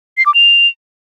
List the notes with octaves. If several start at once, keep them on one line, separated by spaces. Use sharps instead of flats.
C7
D6
F7